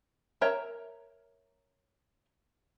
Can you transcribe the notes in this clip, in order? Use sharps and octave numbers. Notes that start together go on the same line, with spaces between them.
A#4 C#5 E5 G5 A#5